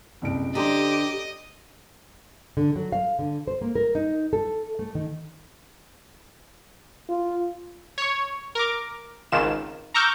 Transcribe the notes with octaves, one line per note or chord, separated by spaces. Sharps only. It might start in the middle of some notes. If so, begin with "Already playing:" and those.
F#1 C2 D7
D3 C#4 G4 C5 D#5 A#5 C6
D3
F#3
F5
D3
C5
A#3
A#4
D#4
A4
A3
D#3
F4
C#5 C#6
A#4 D6
G#1 C#2 D#3 F4 E7
A#5 C#6 D6 E6 F6 G6